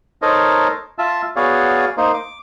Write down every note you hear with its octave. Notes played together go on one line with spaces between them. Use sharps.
D#4 A4 A#4 C5 C#5 D#5
F4 E5 A5 E6
B3 F#4 G#4 C#5 D5 F5
A#3 D#4 C5
D6